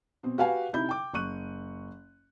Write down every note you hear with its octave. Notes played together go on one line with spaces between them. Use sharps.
B2 C4
F#4 G4 B4 F5 G5 G#5
C3 D#4 E4 B5 G6
G5 D6
F#1 C#6 F#6 D#7